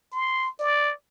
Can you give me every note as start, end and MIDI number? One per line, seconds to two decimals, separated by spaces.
0.13 0.51 84
0.60 0.93 74